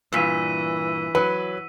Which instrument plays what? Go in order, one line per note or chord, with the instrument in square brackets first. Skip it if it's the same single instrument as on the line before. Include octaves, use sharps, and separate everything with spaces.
[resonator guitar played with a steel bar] G2 A#2 [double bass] E3 [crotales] E6 B6 D#7
[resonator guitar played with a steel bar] F#3 [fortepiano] B4